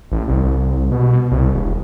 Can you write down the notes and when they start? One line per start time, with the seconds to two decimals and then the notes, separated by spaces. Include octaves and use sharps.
0.12 A1
0.28 C2
0.91 B2
1.31 C2
1.54 E1